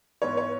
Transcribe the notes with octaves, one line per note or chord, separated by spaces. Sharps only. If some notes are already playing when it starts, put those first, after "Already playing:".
G#2 E3 B3 C#5
C#5